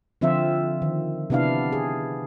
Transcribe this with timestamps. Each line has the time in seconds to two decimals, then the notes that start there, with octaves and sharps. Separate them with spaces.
0.21 D3 F3 C4 F4 E5
0.82 D#3
1.30 C3 B3 D4 E4 F5
1.72 G#4